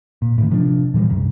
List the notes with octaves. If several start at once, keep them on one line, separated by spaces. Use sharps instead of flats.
A#2
A2 D3 D#3
C3 F3 F#3 D4
A#2 E3 G3 G#3
C2 F#2